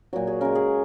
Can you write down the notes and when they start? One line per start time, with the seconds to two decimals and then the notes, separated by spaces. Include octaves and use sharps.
0.13 A#2 F#3 F#4
0.27 G#4
0.41 C#3 G#3 A#4
0.55 G#4